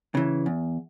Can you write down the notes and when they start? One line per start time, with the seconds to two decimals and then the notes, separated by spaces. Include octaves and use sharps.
0.15 C#3 E3
0.46 E2